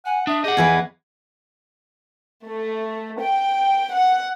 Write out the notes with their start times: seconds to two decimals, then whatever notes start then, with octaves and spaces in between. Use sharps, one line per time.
0.05 F#5 G#5
0.27 D4 E5 D#6
0.44 G4 G#4 D#5 F#5
0.57 E2 E3 B4 G#5
2.46 A3
3.19 G5
3.94 F#5